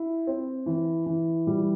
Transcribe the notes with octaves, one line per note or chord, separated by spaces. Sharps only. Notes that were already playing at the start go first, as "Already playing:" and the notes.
Already playing: E4
C4
E3
E3
G3